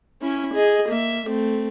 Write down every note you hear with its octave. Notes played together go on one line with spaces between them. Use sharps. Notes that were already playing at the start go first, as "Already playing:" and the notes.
C#4 E4
G#4 D#5
A#3 E5
A3 C4